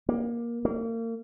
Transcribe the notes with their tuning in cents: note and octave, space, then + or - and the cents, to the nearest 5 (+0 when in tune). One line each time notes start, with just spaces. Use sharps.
A#3 +15
A#3 -35